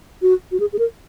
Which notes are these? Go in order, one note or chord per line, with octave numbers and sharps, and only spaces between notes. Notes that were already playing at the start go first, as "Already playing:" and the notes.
F#4
F#4
G#4
G#4
A#4